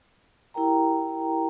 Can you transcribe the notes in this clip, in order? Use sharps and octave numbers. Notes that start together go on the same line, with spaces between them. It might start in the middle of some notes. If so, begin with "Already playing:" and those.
E4 G4 A#4 G5 A#5